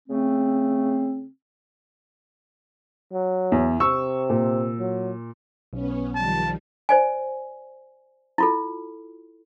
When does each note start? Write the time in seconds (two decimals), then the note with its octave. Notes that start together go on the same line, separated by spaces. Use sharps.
0.08 C#3 A3 C4
3.12 F#3
3.52 E2
3.80 C3 C#6 E6
4.30 A#2
4.79 F#3
5.73 B1 B3 C#4
6.15 D#3 F3 G3 A5
6.89 C5 D5 G#5
8.38 E4 F4 A4